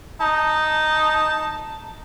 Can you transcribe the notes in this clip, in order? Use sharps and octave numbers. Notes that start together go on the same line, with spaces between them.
D#4 A5